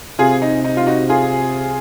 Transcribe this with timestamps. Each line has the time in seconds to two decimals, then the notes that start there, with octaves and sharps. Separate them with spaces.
0.19 C3 F4 G#4
0.42 D#4
0.64 D#4
0.77 F4
0.87 D#4 F#4
1.09 F4 G#4